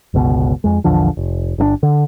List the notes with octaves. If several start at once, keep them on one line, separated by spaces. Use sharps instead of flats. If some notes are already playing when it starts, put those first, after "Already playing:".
G1 C#2 B2
F2 G#3
A#1 E2 D3 F3
F1
G1 D3 D4
D3